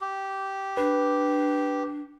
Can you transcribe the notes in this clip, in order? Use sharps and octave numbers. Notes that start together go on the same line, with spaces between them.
G4
D4 B4